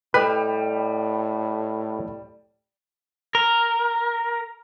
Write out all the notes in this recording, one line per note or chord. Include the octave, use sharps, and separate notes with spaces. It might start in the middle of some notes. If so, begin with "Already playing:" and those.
A2 G3 A4 B4 D#5 G5
A#4